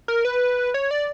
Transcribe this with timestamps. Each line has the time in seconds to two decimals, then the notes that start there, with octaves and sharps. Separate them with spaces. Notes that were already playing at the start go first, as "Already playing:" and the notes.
0.08 A#4
0.25 B4
0.74 C#5
0.91 D5